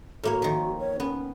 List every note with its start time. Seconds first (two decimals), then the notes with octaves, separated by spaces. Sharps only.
0.24 A2 A#3 F#4 C#5
0.42 D#3 F3
0.79 C#5
1.00 B3 C#4